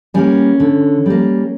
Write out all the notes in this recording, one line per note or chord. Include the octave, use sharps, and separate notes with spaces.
G3 A#3 C#4
D3
G3 A#3